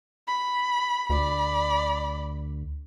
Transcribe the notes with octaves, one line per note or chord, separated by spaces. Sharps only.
B5
D2 D5 B5